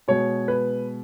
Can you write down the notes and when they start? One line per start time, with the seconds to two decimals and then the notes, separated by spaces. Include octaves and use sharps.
0.08 B2 G#3 C#5
0.48 B4